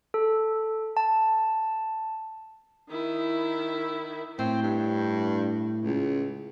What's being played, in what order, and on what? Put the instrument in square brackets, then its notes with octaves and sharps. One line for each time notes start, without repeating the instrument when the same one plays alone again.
[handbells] A4
A5
[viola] D#3 E4
[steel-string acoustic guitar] A2 [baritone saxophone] C4
[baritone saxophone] G2
C#2